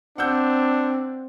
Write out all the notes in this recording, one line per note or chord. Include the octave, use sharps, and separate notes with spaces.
C4 D4 F#5 E6 G6